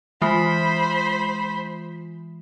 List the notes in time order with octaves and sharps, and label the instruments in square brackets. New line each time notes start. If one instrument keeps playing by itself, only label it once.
[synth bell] E3 G#3 F4 [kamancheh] C5 B5